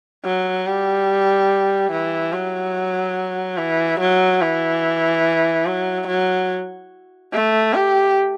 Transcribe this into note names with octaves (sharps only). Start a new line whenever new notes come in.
F#3
G3
E3
F#3
E3
F#3
E3
F#3
F#3
A3
G4